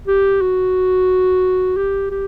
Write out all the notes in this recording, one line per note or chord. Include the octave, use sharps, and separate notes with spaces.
G4
F#4
G4
G4